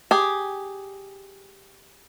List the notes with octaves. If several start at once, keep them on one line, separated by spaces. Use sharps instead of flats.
G4 G#4